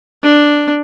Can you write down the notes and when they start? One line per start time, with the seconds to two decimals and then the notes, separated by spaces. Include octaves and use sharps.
0.23 D4